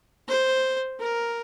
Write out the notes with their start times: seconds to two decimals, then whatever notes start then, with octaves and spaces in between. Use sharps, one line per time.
0.28 C5
1.00 A#4